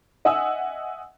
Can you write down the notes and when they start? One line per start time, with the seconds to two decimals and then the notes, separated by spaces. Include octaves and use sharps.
0.25 D#5 E5 F#5 G#5 D#6 E6